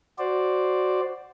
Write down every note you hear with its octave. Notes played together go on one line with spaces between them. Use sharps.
F#4 C5 D5